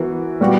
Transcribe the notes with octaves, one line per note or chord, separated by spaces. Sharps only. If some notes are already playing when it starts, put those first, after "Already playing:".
Already playing: E3 B3 F#4 A#4
A#2 G3 B3 F#4